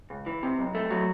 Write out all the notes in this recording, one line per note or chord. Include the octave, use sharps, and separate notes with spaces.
C#2
E3
C3
B1
A3
F#3